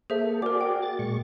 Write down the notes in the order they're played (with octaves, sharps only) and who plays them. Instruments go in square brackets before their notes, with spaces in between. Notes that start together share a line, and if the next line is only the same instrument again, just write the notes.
[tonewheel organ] A#3 A4 [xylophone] G#4 C5 E5
[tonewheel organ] F#4 G#4 D5 [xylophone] A#4 D6
[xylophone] G5
[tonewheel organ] A6
A#2 G#3 C#6